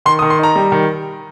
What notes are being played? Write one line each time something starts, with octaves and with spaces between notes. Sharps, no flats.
D#3 C6
D#6
D#3
C6
D#4 A#5
G3
D#3